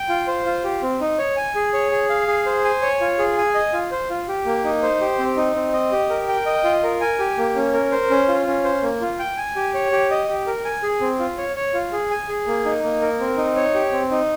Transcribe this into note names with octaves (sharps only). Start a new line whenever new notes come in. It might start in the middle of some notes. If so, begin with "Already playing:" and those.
Already playing: G5
F4
C5
F4
G4
C4
D#4
C#5
G#5
G#4
C#5
G#4
F5
G#4
C5
G#5
C#5
F4
G#4
G#5
D#5
F4
C5
F4
G4
A#3
D#4
C5
G4
C4
D#4
C4
D#5
G4
A#4
G5
D#5
F4
A#4
G#5
G4
A#3
C#4
A#4
C5
C#4
F4
C#4
C5
A#3
F4
G5
G#5
G4
C#5
G4
D#5
G4
A#4
G#5
G#4
C4
F4
C#5
C#5
F4
G#4
G#5
G#4
A#3
D#4
A#3
A#4
C4
D#4
C#5
G4
C4
D#4